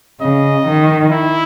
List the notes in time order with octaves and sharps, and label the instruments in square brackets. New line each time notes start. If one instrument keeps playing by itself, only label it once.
[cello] C#3 [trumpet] D#5
[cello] D#3
[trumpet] E4